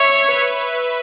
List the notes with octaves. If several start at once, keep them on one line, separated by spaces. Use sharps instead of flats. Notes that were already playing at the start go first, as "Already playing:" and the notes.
Already playing: C#5 E5
E5
B4